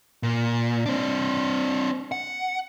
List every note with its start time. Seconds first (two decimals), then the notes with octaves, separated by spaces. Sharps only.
0.23 A#2
0.86 C4 D4
2.12 F#5